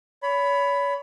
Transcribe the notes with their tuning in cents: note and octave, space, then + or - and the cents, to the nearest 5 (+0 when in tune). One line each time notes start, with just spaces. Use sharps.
C#5 +35 B5 +10